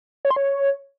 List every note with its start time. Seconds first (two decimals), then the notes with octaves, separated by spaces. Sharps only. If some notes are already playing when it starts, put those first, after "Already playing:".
0.25 C#5
0.31 C6
0.36 C#5